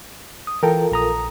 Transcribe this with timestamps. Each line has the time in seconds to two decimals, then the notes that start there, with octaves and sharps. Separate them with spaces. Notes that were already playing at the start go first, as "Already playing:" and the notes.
0.47 D#6
0.63 E3 F4 A4 A#4 G5
0.92 A#1 A#5 D#6